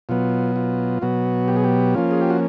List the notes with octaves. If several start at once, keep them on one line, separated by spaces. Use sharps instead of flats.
B2 F#3 B3 F4
F4
B2 F#3 B3 F#4
G4
G#4
G4
F3 A#3 C#4 F4
G#4
G4
F#4